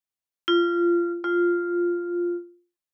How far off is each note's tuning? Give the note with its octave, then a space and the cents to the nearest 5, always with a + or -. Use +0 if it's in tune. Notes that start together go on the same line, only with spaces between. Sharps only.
F4 -20
F4 +0